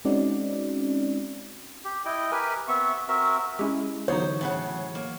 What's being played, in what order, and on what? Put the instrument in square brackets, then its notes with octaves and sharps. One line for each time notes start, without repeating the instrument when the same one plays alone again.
[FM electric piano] G#3 C4 C#4 D#4 F#4 D5
[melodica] G4
E4 D#5 G5
G4 A#4 B4 G#5
B3 C4 E5 C#6
C4 F#4 A#4 E5
[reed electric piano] G#3 E4 [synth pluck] C#4 G4
[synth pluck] D3 B3 D#4 [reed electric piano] E3 F#3 [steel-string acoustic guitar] C5 [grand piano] C#5
[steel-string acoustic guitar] A2 C#3 F#5
A#3